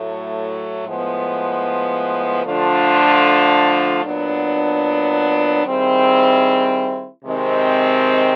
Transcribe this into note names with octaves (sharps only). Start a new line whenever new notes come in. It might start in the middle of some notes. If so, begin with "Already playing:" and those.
Already playing: A2 F#3 A3
A2 F3 G#3 B3
D3 F3 A3 D4 F4
A#2 F#3 B3 D4
D#3 G3 C4 E4 G#4
C3 D#3 G#3 C4